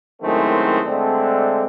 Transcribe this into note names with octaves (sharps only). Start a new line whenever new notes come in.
F#2 A2 D#3 G#3 A3 C4
D3 G#3 A3 C4 D4